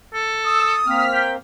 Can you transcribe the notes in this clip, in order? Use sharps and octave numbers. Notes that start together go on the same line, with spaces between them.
A4
D#6 E6
A#3 C4 F6 B6
G5